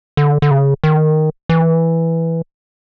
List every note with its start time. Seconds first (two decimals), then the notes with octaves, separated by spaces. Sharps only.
0.17 D3
0.42 D3
0.51 C#3
0.84 D#3
1.49 E3